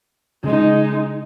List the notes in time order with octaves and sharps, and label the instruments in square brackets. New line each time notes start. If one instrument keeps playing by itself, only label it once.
[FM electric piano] C#3 [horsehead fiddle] G#3 D#4